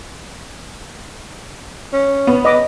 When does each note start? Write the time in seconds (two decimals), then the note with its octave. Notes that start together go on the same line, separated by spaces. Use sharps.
1.93 C#4
2.27 B3
2.45 B4 D#5 D6